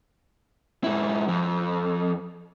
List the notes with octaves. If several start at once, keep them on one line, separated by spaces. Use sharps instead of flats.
G#2 E4
F2